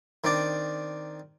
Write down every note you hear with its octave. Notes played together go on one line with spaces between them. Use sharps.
D#3 C4 D4 D5